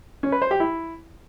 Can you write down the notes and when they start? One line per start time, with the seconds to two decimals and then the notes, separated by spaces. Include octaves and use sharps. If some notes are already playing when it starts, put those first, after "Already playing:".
0.23 C#4
0.32 B4
0.42 C5
0.51 G4
0.60 E4